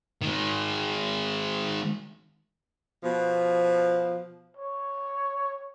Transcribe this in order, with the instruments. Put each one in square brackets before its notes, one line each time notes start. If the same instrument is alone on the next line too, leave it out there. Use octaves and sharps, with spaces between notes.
[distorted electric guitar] D#3 G#3
[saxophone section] B2 F3
[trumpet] C#5